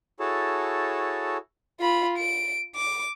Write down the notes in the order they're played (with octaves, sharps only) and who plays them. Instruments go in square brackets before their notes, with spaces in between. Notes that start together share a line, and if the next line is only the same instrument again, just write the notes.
[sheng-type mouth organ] E4 F#4 G#4 A4 C#5 A5
[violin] F4 B5
D7
D6